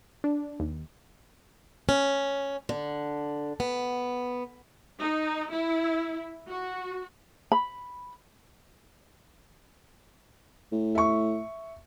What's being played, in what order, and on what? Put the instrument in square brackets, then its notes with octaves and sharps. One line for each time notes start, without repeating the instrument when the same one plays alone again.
[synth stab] D4
D#2
[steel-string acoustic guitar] C#4
D3
B3
[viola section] D#4
E4
F#4
[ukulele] B5
[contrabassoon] A2
[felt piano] E5 C#6